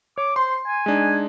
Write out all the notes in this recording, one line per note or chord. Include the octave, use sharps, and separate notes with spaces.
C#5 D6
C5 C6
G#5
G#3 D4 D#4